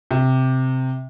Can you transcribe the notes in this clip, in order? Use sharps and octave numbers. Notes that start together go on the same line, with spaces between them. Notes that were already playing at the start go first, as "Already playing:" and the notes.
C3